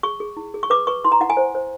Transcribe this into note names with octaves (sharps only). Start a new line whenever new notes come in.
G#4 C#6
G#4
E4
G#4
C#6
B4 D6
B4 C#6
E4 C6
A#5
E4 F#5
G#5
C5
C5